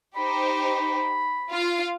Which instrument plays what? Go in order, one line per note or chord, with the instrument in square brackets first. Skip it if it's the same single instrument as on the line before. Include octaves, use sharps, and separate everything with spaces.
[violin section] D#4 G4 C5 [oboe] B5
[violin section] F4 F5